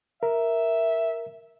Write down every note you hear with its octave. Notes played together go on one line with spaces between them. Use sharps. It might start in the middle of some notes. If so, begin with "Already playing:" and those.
A#4 E5